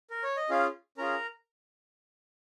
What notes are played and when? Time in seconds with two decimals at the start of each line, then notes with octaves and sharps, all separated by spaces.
0.10 A#4
0.23 C#5
0.37 D#5
0.50 C#4 F4 G#4 F5
0.98 C#4 F4 G#4 A#4 A#5